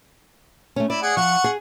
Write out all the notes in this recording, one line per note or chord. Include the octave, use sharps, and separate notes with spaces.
A3 C#4
E4 D5
G#4 F#5
F3 F#5 C#6
G#4